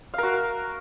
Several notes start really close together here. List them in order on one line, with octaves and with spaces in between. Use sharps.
F5 A#4 F#4